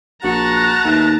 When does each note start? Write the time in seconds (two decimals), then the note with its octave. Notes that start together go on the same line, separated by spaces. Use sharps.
0.23 A#1 F#4 A5 A#5 F#6
0.84 D#2 B2 G#3 A3